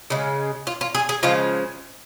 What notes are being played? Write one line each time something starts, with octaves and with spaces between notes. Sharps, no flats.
C#3 G#3
F4
F4
G#4
G#4
C#3 F3 G#3 F4